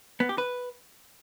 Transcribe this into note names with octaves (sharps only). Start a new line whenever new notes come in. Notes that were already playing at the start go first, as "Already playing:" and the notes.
B3
G4
B4